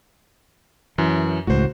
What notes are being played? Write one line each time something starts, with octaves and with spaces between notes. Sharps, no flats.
F#2 E3
C#2 A2 F#4 C5